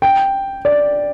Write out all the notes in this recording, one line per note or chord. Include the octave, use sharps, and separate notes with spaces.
G5
D5